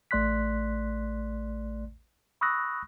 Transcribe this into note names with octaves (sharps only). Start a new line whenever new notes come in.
A1 A3 D5 C6 F#6 B6
B5 C#6 D#6 E6 F#6 A#6